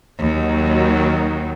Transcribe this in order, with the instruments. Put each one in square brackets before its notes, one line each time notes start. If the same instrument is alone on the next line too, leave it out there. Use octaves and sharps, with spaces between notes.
[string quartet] D#2 [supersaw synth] D#3 F#3